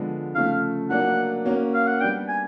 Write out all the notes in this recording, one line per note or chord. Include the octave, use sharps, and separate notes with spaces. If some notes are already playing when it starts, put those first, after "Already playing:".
Already playing: D3 F3 G#3 B3
C#3 F3 A3 F5
F#3 A#3 D4 F#5
A#3 C#4 F#4
F5
F#5
G3 B3 D4 G5
G#5